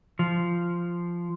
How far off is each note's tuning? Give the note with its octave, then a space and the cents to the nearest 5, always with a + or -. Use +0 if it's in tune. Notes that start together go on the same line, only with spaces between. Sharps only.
F3 -10